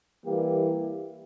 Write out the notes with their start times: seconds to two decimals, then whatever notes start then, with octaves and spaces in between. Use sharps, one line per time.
0.26 E3 G3 A#3 E4 G4